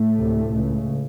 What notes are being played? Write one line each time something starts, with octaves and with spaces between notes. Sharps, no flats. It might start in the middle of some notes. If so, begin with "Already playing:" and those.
Already playing: A2 A3
D2 C3
C#2 C#3